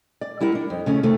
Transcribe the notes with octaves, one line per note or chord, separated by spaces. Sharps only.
D5
G3 E4 A#4 F#5
D4
F2
C#3 A3 C#4
C3 D#3 A3